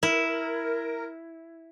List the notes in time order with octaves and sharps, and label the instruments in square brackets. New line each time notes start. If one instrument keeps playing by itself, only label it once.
[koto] E4 [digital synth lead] A#4